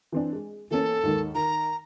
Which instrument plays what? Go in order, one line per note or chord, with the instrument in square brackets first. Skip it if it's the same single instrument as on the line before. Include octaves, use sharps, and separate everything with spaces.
[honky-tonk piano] E3 C4 D4
G#3
[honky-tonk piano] E3 A#3 C#4 [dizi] A4
[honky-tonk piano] D#2 G#2 D#3
[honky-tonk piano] D#3 [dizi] A#5